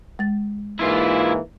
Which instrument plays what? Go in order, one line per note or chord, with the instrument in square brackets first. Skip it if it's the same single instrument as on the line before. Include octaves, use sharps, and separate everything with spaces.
[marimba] G#3 A6
[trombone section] G#2 E3 A#3 [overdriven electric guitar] E4 F4